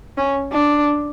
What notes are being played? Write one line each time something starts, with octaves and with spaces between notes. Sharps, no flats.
C#4
D4